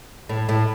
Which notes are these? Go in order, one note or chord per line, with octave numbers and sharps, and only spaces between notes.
A2
A2